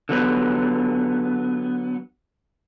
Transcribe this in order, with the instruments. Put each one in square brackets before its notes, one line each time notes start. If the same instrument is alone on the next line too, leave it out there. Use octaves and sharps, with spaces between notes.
[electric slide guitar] D3 F#3 B3